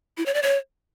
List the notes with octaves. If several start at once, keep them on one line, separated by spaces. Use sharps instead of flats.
E4
C#5
D5
C#5